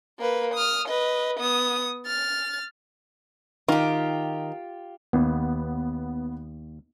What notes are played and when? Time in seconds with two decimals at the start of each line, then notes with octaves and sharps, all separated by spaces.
0.19 A#3 B4
0.54 D#6 F6
0.88 B4 D#5
1.40 B3 D#6
2.06 F6 A6
3.68 D#3 F4 G4
5.13 D#2 B3